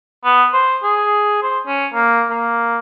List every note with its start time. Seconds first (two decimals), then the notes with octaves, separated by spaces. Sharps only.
0.24 B3
0.54 C5
0.83 G#4
1.43 C5
1.67 C#4
1.94 A#3
2.30 A#3